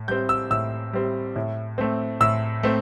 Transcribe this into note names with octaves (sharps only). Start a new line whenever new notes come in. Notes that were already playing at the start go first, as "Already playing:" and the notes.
Already playing: A2
G3 C4 G6
E6
A2 E6
G3 C4
A2
A3 C4
A2 E6
A3 C4